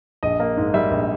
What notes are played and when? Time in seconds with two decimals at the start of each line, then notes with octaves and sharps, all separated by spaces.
0.23 A#1 D#5
0.40 A#3
0.57 G#2
0.74 G3 E5
0.91 A#1